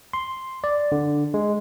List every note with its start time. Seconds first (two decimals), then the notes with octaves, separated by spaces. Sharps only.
0.13 C6
0.64 D5
0.92 D3
1.34 G#3